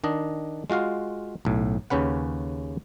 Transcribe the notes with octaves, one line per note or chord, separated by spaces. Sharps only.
D#3 D4 D#5
G#3 F4 F#4 F5
B1 A2
D#2 C#3 C#4 B4 F#5